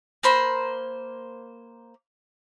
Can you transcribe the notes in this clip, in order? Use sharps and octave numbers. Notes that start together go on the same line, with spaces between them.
A#3 C5 B5